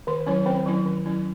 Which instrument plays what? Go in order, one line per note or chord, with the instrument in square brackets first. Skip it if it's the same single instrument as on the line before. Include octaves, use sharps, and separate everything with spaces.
[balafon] D#3 C5 C6
F#3 C#4 E4 C#5
D#3 C4 C5
F#3 C#4 E4
D#3
F#3 C#4 E4